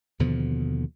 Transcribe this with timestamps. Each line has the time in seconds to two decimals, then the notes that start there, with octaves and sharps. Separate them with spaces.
0.19 D#2 B2 D3 F3